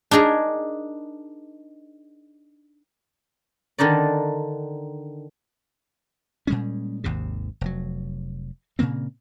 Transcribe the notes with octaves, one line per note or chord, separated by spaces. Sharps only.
D4 D#4 G#4 A#4
D3 D#3 D4 D#4 D5
A#2 G3 G#3 C#4
G#1 D#2 G#2 C3
F1 F#3
A#2 C#3 A#3 C4